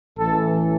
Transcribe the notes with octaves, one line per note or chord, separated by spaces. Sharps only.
A1 A2 E3 A4